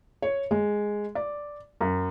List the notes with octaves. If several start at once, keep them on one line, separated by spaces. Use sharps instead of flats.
C#5
G#3
D5
F#2